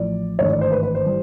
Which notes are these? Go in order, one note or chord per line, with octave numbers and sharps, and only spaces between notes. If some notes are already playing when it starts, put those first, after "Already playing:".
Already playing: A1 A2 F3 A3 D5
G#1 G2 E3 A3 C#5
D5
C5
B4
B4
C5
E3 G3